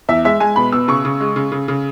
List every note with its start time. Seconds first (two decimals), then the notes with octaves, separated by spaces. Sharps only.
0.09 E2 E5
0.25 G#3 E5
0.40 G#3 G#5
0.56 B2 B5
0.72 B2 E6
0.88 C#3 C#6
1.05 C#3
1.20 G#3
1.36 C#3
1.52 C#3
1.68 C#3